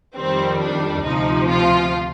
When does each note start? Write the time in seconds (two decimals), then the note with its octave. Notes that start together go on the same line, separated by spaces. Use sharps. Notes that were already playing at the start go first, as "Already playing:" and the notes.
0.16 F2 D#3 G3 C4
0.61 D4
1.05 D2 C3 F3 D#4
1.49 F4